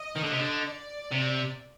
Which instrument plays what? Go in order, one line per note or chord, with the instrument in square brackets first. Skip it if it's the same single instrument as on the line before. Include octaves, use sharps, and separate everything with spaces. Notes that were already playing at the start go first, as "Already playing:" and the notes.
Already playing: [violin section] D#5
[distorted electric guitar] D#3
D3
C3
D3
[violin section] D5
[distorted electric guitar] C3